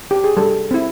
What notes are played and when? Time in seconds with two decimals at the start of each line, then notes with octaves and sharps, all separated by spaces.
0.11 G4
0.24 G#4
0.37 G3 A4
0.71 C4 E4